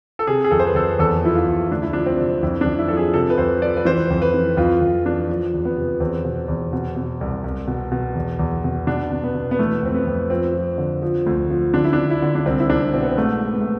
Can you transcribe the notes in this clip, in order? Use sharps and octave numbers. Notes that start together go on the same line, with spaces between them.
A4
C3 G#4
G#4
F2 A4
C5
B4
F2 A4
E2 A4
F3 E4
F4
E2
D2 D4
E4
F3 D4
C4
C3
F2 E4
F2 D4
E4
F3 A4
G#4
C3 A4
B4
F2 C5
F3 D5
B4
E3 C5
F2
B4
E3
F2 F4
F2
E3 D4
F3
E2
B3
C3
E2 C4
B2
E2
B2
B2
C2
C2
B2
B2
E2
E2
B2
B2 D4
B2
B3
B2
B3
E3 A3
F2 C4
B3
F2
F3 C4
F3
D3
F3
D2
F3
D3 D4
E4
D4
D3
E4
D3
D4
C2 C4
E4
C2 D4
B2 C4
B3
C4
G#2 A3
G#2
B3
A3